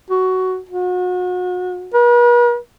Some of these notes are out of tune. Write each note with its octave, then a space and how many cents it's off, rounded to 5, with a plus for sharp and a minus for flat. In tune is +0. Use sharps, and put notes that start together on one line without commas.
F#4 +10
F#4 -35
B4 -45